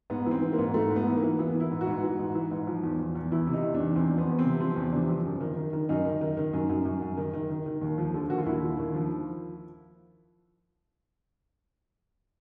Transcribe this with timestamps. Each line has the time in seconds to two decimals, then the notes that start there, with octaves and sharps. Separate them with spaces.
0.10 G#2 B3
0.26 E3
0.31 C4
0.42 E3
0.53 A#3
0.58 G#2
0.74 G#2 A3
0.90 G#2
0.96 B3
1.07 E3
1.17 A#3
1.23 E3
1.39 E3 B3
1.54 E3
1.60 E4
1.71 G#2
1.81 F#4
1.87 G#2
2.03 E3
2.19 G#2
2.35 E3
2.51 G#2
2.67 F3
2.83 E2
2.99 E2
3.15 E2
3.32 E2 E4
3.47 C3
3.53 D#4
3.64 E2
3.75 D4
3.80 E2
3.96 E2 C4
4.12 F3
4.18 B3
4.28 E2
4.39 C4
4.44 C3
4.60 F3 C4
4.76 E2
4.92 C3 D4
5.09 F3
5.25 F#2
5.41 D#3
5.57 D#3
5.73 D#3
5.89 F#2 D#4
6.05 D#3
6.21 D#3
6.37 D#3
6.53 F#2
6.69 F#2
6.85 F#2
7.02 F#2
7.17 D#3
7.33 D#3
7.50 D#3
7.66 D#3
7.82 D#2
7.98 F3
8.14 D3
8.30 D#2 F#4
8.38 F4
8.46 D#2 E4
8.62 D3
8.78 D#2
8.94 F3